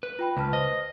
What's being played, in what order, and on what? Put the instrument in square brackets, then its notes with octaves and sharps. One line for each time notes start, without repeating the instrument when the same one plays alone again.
[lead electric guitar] B4
[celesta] F4 G5 B5
[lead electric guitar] C#2 [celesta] B4 A5 F6
[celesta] C5 [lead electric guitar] D#5